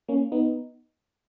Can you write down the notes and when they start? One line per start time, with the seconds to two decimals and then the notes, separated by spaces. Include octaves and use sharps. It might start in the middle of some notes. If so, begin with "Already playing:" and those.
0.09 A#3 C#4
0.32 B3 D#4